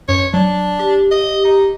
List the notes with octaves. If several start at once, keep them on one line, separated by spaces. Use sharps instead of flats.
F#2 C#5
F#3 D4
G4
D#5
D#4